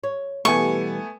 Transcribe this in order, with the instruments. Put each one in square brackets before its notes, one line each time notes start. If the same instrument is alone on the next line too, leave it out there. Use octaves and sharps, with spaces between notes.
[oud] C#5
[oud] B2 E3 G3 [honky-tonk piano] A3 B3 G#5 [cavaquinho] C#6